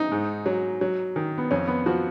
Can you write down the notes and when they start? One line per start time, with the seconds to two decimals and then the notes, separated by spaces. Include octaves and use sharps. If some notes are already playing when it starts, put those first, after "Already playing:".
Already playing: D#4
0.11 G#2
0.46 F#3
0.81 F#3
1.16 D#3
1.38 B3
1.51 F2 C#4
1.68 B3
1.86 F3 F#4